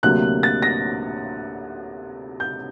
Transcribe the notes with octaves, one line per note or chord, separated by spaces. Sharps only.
D2 C3 F#3 A#3 F#6
A6
A#6
G6